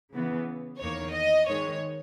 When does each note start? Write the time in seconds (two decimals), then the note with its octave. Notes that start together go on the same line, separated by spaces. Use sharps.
0.13 C#3 E3 B3
0.79 E2 D#3 A#3 C#5
1.13 D#5
1.46 G#2 D#3 G#3 C#5